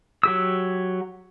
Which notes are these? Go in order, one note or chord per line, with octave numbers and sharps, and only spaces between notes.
F#3 G4 E6